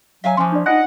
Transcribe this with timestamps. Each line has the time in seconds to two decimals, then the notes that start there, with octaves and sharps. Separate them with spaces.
0.24 F#3 E5 F5 G#5
0.37 E3 F3 C#4 C6
0.52 D4 D5
0.66 D#4 F4 D#5 F#5 G#5